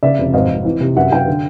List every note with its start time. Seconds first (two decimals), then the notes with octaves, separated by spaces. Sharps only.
0.03 C#3 D5 E5
0.18 F1
0.34 G#1 D#5 F5
0.49 G#1
0.65 E3
0.80 C3
0.97 F#2 E5 F#5
1.12 F#2 F5 G5
1.28 D3